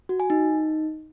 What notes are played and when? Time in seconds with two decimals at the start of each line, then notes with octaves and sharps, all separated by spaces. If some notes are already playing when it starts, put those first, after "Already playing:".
0.09 F#4
0.20 G#5
0.30 D#4